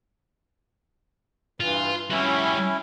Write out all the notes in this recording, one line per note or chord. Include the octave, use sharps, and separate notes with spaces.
G2 E3 F4
G3 C#4 E4 F#4